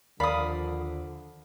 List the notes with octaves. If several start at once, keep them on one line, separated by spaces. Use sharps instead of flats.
D#2 D3 F3 A#4 D5 F5 B5 D#6